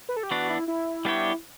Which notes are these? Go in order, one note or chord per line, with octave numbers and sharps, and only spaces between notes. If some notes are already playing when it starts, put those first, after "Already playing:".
B4
A4
G4
E3 B3 D4 F#4
E4
E4
G3 B3 D4 G4 C#5